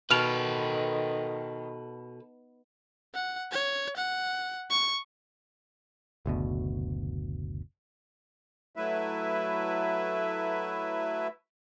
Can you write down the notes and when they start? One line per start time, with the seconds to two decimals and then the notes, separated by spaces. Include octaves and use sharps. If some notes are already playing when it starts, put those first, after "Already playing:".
0.10 B2 D#3 A4 B4 F6 F7
3.14 F#5
3.52 C#5
3.97 F#5
4.70 C#6
6.26 F#1 D2 B2
8.76 F#3 A3 E4 B4 E5